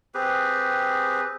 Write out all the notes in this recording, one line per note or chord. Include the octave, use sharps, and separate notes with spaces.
C4 G4 G#4 B4